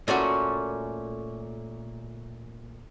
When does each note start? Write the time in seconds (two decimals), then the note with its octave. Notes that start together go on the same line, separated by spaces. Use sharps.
0.08 A#2 A3 C#4 F#4